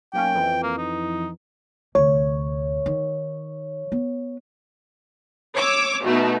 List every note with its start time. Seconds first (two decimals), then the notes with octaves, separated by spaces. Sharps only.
0.13 B1 A#3 C#4 G5
0.35 F2 E3
0.63 A#3
0.77 D#4
1.95 D2 C3 C#5
2.86 D#3
3.92 B3
5.56 C#5 D6 E6
6.05 B2 A3 D#4